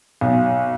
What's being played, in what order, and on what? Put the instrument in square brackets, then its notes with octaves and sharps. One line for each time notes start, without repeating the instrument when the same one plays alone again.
[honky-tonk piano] B1